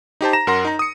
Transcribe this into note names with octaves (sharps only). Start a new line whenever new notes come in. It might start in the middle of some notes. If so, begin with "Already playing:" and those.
D#4 G4 C5 A5
A#5 A#6 E7
F#2 A#4 F#5 C6 A#6
D#4 A#5
D#6 C#7